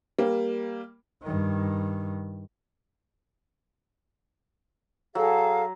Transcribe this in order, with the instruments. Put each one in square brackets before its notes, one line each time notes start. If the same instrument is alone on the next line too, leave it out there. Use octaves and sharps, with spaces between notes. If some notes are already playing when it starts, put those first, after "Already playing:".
[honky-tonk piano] G3 A#3
[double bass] G2 D#3
[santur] F#3 [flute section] G#4 A4 F5